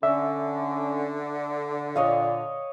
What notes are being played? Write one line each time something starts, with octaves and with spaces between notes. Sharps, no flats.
D3 C#4 E5
A#2 C#5 D#5 F5